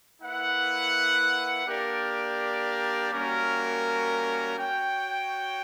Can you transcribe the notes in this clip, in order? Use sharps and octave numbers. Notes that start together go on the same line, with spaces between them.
A#3 E4 B4 F#5
A#3 D4 G4 A#4 D5
G3 A#3 C#4 F#4 A#4
F#4 C#5 G5